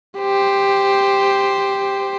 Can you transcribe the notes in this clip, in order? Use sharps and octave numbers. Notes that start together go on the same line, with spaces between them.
G4 C5